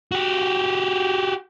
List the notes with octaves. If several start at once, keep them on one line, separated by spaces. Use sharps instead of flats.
F#4 G4